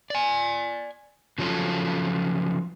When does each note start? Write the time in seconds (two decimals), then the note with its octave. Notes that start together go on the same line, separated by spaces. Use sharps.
0.10 D5 G#5
1.38 C#3 F3 F#3 C#4 F4 A4